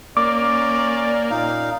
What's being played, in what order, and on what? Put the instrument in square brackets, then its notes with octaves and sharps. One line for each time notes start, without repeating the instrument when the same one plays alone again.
[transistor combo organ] A#3 [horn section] C#4 D5 [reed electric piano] D6
[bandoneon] A#2 D#4 F5